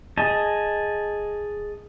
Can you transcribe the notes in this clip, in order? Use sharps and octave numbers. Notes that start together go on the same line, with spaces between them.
G#4 D#5 A5